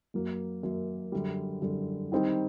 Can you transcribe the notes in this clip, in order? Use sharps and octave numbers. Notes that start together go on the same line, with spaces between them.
F#2 F#3 A#3
F#2 F#3 A#3
F#2 D3 G3
F#2 D3 G3
D#3 G3 C4 D#4